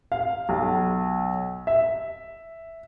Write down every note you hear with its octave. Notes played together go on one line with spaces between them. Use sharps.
F5
B1
E5